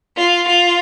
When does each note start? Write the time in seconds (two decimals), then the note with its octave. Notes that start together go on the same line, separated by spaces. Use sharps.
0.17 F4
0.47 F4